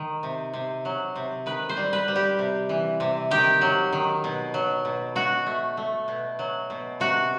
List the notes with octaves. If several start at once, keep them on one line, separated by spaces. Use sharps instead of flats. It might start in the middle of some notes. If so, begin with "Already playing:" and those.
Already playing: D#3
C3
C3
F#3
C3
D#3 B4
C5
G3
B4
G3
G4
C3
E3
C3
D#3 G4
F#3
D#3
B2
F#3
B2
B2 F#4
A3
A3
B2
F#3
B2
C3 F#4